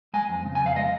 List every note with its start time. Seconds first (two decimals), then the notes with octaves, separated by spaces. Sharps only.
0.14 G#3 G#5
0.29 F2
0.45 C#3
0.55 G#5
0.61 F2
0.66 F5
0.76 G#3 D#5